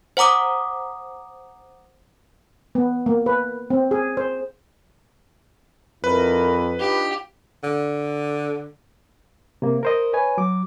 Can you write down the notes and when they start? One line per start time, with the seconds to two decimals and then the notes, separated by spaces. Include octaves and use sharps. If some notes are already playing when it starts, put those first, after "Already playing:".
0.17 C5 F#5 A#5 D6 D#6
2.75 B3
3.06 A#3
3.26 B4
3.70 C4
3.91 G#4
4.17 C5
6.04 F2 C4 E4 A#4 B4
6.80 D4 D#4 F4 G4
7.64 D3
9.62 C3 A#3
9.83 A#4 C5 D#5
10.13 B4 C#5 G#5
10.38 F#3 D6